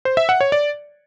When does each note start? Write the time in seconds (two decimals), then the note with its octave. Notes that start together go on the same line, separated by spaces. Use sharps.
0.05 C5
0.17 E5
0.29 F#5
0.41 C#5
0.52 D5